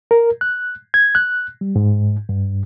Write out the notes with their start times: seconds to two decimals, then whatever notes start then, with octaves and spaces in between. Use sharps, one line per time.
0.11 A#4
0.41 F#6
0.94 G#6
1.15 F#6
1.61 G3
1.76 G#2
2.29 G2